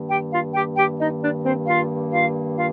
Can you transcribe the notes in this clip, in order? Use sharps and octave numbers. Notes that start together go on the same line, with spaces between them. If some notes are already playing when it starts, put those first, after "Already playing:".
Already playing: G2 D#3 A#3
G4 G5
F4 F5
G4 G5
G4 G5
D#4 D#5
D4 D5
C4 C5
F4 F5
F4 F5
F4 F5